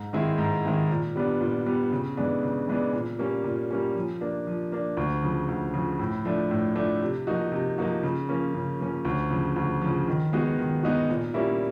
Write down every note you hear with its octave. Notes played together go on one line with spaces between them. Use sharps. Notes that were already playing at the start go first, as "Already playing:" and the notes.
Already playing: G#2
D#3 G#3 C4 E4
G#2
D#3 G#3 C4 E4
A#2
G3 B3 D4
A#2
G3 B3 D4
C#3
E3 G#3 B3 D4
C#3
E3 G#3 B3 D4
A#2
G3 A#3 C#4
A#2
G3 A#3 C#4
F3
A#3 D4
F3
A#3 D4
D2
C#3 F3
D2
C#3 F3
A2
F3 A3 D4
A2
F3 A3 D4
C3
F3 A#3 D#4 F#4
C3
F3 A#3 D#4 F#4
C#3
F3 A#3 C#4
C#3
F3 A#3 C#4
D2
C#3 F3
D2
C#3 F3
D#3
G#3 B3 D#4 F#4
D#3
G#3 B3 D#4 F#4
A#2
G3 A#3 C#4 E4